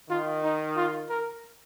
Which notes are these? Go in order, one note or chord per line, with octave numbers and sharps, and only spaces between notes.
D#3 F4
D#4
F4
A#4